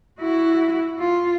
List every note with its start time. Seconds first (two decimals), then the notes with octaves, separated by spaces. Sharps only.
0.20 E4 F#4
0.99 F4